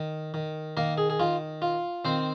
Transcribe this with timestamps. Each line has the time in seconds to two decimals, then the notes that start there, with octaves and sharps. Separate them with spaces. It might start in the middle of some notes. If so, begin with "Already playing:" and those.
Already playing: D#3
0.34 D#3
0.77 D#3 A#3 A#4
0.98 G#4
1.10 G#4
1.20 D#3 F4
1.62 F4
2.05 D#3 C4 C5